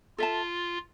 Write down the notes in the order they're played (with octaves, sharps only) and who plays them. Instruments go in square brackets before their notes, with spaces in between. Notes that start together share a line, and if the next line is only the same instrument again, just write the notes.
[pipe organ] F4 [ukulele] A4 E5 A5